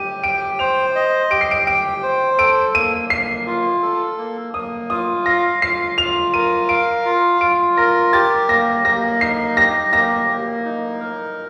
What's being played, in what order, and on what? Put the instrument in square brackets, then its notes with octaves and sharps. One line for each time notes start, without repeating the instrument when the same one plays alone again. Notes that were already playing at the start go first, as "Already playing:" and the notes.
Already playing: [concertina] G4 [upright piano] D#7
[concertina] G5 [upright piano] D7
[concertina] C5 [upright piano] F7
[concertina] D#5
[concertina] G4 [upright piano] D7
[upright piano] C7
D7
[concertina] G5 [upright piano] D7
[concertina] C5
[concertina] A4 [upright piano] D7
[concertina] A#3 [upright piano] D#7
[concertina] A#3 [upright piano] C7
[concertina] F4
A4
A#3
[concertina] A#3 [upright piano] D#6
[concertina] F4 [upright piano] D#6
[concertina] F5 [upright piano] A#6
[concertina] F4 [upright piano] C7
[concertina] F4 [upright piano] F7
[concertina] A#4 [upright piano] D#7
[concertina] F5 [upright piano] D7
[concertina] F4
[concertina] F4 [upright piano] D7
[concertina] A#4 [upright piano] A#6
[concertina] G4 [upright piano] A6
[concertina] A#3 [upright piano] A#6
[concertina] A#3 [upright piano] A#6
[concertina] D#4 [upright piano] C7
[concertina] G4 [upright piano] A#6
[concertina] A#3 [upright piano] A#6
[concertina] A#3
D#4
A#4